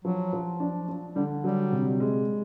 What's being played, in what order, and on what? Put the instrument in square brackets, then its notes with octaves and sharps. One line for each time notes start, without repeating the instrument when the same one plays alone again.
[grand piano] F3 [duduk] F#3
[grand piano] F3
D4
D4
[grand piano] D3 [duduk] G3
[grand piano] F#3 [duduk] G3
[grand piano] C3
G#3